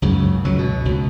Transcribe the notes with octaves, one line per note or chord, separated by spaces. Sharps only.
C#2 F#2 C#3
C#2 F#3
B2
C#2